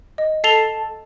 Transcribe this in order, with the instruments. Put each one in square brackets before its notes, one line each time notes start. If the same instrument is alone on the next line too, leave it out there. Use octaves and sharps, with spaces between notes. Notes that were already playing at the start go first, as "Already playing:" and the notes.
[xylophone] D#5
[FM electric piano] A4 A5 [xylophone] C7 F7 G7